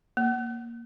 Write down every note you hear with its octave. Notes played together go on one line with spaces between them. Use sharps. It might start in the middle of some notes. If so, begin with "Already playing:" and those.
A#3